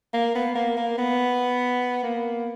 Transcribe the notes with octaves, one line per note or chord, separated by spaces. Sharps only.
A#3
B3
A#3
A#3
B3
A#3